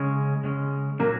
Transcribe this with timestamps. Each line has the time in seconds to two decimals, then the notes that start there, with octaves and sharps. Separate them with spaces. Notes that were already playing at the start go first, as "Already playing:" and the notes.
Already playing: C#3 G#3 C#4
0.44 C#3 G#3 C#4
0.99 A#2 F#3 A#3 C#4 F#4